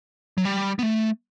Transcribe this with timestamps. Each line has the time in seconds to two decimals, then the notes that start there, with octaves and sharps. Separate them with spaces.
0.38 F#3
0.45 G3
0.79 B3
0.83 A3